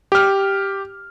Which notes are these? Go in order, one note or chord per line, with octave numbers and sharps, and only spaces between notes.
G4 F6